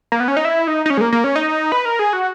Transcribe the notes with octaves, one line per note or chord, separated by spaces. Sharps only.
A#3
B3
C#4
D#4
E4
D#4
D#4
C#4
G#3
A#3
A#3
C#4
D#4
B4
A#4
G#4
F#4